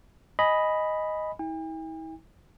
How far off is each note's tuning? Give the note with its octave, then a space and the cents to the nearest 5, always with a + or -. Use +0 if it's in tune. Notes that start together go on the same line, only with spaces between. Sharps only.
D#5 +0 G#5 +0 B5 +0
E4 -45 G5 +45